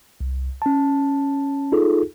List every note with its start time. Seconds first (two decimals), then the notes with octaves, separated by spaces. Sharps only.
0.21 C2
0.62 C#4 A5
1.72 D#4 F4 G#4 A4